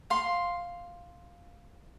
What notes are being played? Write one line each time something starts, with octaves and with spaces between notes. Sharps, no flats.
F5 C6